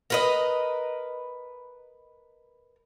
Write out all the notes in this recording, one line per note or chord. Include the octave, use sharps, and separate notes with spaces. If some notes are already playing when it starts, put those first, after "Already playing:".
A#4 B4 D#5